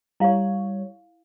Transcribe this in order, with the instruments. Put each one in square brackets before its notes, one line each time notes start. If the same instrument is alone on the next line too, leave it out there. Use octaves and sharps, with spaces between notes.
[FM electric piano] G3 C#5 [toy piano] E4 F5